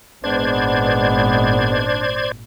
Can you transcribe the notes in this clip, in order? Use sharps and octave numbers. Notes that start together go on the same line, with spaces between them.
G#1 A#2 G#3 B3 D4 C5 D5 G#6